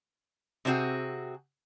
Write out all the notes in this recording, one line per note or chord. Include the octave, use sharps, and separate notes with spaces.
C3 C4 D4 F#4 G#4